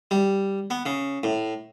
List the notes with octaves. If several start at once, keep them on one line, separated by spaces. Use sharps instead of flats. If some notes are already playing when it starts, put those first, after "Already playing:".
G3
B3
C#3
A2